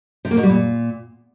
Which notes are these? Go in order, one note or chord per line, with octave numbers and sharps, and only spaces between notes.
C3
A#3
B2
G3
A#2